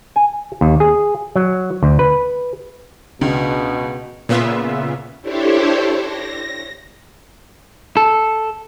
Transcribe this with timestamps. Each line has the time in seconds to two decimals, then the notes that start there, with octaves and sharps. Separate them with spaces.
0.16 G#5
0.61 D#2
0.80 G#4
1.36 F#3
1.83 D2
1.99 B4
3.21 C#2 B2 D4
4.29 A#2 C#3 B3 F4 E5
5.21 D4 E4 G4 A4 C5 C#5
6.02 A#6
7.97 A4